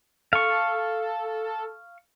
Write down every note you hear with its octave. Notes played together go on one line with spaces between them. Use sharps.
A4 F5 C#6